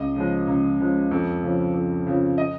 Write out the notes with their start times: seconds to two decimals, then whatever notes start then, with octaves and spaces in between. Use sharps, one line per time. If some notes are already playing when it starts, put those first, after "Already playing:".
Already playing: C#2 D#5
0.16 C#3 F3 G#3
0.47 C#2
0.80 C#3 F3 G#3
1.11 F2
1.44 C#3 F3
1.74 F2
2.07 C#3 F3
2.38 D#5